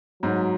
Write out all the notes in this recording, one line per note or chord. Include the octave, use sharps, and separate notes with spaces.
G#2 F#3